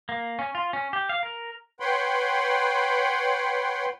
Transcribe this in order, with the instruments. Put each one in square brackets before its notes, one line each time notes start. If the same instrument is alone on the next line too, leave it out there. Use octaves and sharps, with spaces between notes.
[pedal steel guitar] A#3
C#4
F4
C#4
G4
F5
A#4
[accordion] B4 C#5 F#5 G5 B5 C6